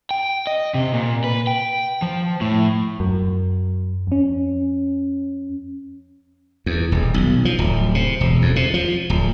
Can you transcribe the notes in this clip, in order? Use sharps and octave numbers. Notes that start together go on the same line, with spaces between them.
G5
D#5
C3
A#2
B4
G5
F3
A2
F#2
F2 C#4
E2
D#1
B1
F3
D1
C3
E1
F2
C3
F3
D1